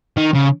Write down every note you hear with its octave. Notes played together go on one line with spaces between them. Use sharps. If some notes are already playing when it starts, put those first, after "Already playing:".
D#3
C#3